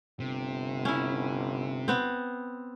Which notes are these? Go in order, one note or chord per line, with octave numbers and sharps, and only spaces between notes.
G1 C3
C#4 E4
B3 C4